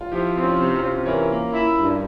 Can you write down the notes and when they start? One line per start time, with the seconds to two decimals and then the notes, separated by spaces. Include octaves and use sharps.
0.01 F4
0.12 F3 E4 G4
0.36 C4
0.43 C#4 F4
0.58 C3
0.74 C#4 F4
0.82 C3
1.06 E3 A#4 C#5
1.30 A#3
1.53 E4
1.77 G2